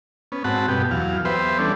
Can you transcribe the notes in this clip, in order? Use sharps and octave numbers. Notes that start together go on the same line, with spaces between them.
B3 C#4
G#2 C4 F#4 F#5 A5 B5
G2 B2 B3 G4
E2 F#3 F5
B3 G4 B4 C5 E5 C6
E3 G3 C#4 D4 A4